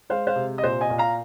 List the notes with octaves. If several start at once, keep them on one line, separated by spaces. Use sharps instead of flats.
G#3 C5 F5
C5 F5
C3
D#5
A#2 C5
D#5 G#5
A#2
F5 A#5